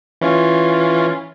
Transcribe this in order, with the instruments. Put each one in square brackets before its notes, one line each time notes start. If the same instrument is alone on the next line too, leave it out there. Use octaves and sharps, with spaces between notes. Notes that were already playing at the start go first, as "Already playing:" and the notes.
[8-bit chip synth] E3 C#4 F4